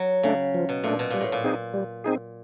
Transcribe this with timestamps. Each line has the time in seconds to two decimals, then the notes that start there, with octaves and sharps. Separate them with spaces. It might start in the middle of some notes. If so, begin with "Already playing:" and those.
Already playing: F#3
0.23 C#3 A3 D4
0.54 F3
0.69 B2
0.84 A#2 A3 D4
0.99 B2
1.10 A#2 G3
1.21 A2
1.32 A#2
1.44 C4 D#4 G#4
1.74 G3
2.04 C4 D#4 G#4